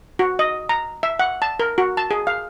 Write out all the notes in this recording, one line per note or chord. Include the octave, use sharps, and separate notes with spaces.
F#4
D#5
A#5
E5
F#5
A5
A#4
F#4
A5
G#4
F5